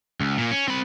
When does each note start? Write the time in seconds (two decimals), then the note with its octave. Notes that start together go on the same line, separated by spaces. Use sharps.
0.21 C#2
0.37 A#2 A#3
0.51 C#4
0.68 C4 B5